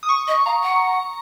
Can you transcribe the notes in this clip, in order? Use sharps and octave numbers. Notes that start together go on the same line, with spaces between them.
D#6
C#6
D#5
F5 A#5
F#5